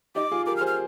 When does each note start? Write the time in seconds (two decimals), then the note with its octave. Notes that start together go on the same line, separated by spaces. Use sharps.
0.15 D#4 G4 D6
0.32 F4 G#4
0.46 G4 A#4 D6
0.57 F6
0.61 G#4 C5
0.67 F6